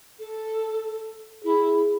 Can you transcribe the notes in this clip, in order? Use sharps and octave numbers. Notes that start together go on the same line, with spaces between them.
A4
E4 G#4